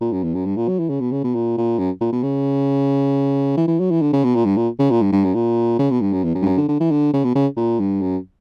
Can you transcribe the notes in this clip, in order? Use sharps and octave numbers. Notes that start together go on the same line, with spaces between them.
A#2
F#2
E2
F#2
G2
A#2
F#3
E3
C#3
B2
C#3
B2
A#2
A#2
F#2
A#2
B2
C#3
E3
E3
F#3
E3
D3
C#3
B2
A#2
G2
A#2
C#3
A#2
G2
G2
F#2
A#2
C#3
B2
G2
F#2
E2
F#2
G2
F#2
D3
D3
E3
D3
C#3
B2
C#3
A#2
G2
F#2